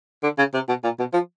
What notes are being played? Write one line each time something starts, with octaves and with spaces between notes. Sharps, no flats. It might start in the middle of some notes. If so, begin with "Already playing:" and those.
D3
C#3
C3
B2
A#2
B2
F3